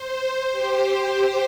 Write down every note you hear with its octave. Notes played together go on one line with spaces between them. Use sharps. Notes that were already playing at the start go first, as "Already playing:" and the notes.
Already playing: C5
G4